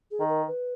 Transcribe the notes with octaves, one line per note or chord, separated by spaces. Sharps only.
G#4
D#3
A#4
B4